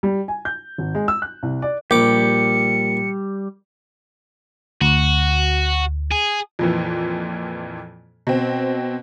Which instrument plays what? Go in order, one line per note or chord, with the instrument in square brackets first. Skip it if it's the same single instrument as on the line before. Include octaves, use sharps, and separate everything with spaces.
[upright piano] G3
G#5
G6
G#1
G#3
E6
F#6
C2
D5
[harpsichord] A#1 D6 [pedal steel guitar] G3 G4 [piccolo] C#7
[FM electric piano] D2 [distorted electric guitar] F#4
[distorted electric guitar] G#4
[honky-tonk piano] F2 A#2 E3
B2 C4